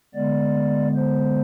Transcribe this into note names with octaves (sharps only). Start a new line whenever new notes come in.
D3 G#3 B3 D5
C5